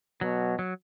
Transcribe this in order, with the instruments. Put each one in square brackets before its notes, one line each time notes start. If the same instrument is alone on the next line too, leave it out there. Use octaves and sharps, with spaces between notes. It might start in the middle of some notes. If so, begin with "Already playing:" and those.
[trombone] B2 [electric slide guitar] F#3
[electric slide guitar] F#3